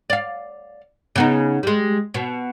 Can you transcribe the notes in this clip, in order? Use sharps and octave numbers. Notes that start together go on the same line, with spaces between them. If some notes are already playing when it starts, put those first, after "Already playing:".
D5 F5
C#3 B3 D#4
G3 G#3
B2